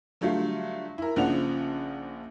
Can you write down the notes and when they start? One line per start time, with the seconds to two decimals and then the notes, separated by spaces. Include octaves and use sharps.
0.21 D3 F#3 G3 A3 F4
0.98 E4 A#4
1.16 A#1 C#3 F3 D4 F#5 F7